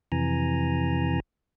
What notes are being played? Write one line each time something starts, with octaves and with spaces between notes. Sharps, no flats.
F2 C3 E3 G#5 A#5